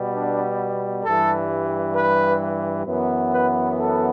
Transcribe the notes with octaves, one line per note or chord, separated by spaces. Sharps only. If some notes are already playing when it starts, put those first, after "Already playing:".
Already playing: B2 G3 B3
D4
G2 E3 G3 A4
B4
F#2 E3 B3
B4
A4